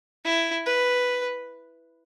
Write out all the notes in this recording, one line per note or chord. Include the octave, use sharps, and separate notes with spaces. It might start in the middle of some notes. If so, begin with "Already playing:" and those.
E4
B4